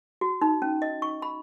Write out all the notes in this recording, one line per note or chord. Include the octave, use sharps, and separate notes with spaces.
F#4
D#4
C#4
D#5
C#6
B5